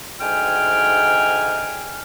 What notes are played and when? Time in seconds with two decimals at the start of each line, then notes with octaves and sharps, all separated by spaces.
0.21 D2 G#2 G5 G#5 F6